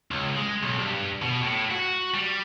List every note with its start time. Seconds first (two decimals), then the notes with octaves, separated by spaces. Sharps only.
0.11 C#2
0.36 G#3
0.63 B1
0.79 G2
1.22 B2
1.43 A2
1.71 F#4
2.14 G3